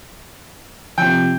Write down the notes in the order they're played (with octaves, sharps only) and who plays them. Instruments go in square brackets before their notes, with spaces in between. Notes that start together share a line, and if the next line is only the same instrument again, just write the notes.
[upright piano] C3 F3 [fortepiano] G5